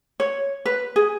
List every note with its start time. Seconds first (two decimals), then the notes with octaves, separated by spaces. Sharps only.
0.20 C#5
0.66 B4
0.96 G#4